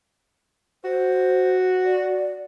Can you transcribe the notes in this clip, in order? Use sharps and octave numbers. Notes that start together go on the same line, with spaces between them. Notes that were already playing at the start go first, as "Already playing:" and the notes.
F#4 C5
D5